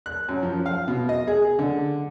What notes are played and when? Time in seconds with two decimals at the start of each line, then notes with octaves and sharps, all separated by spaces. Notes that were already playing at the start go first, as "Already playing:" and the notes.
0.06 F#6
0.29 F#2
0.43 F3
0.66 F5
0.88 B2
1.09 D#5
1.27 G#4
1.59 D3